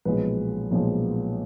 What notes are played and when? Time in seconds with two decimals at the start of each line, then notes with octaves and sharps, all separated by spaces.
0.05 B1 A#2 F3 G#3 B4
0.71 B1 A#2 F3 G#3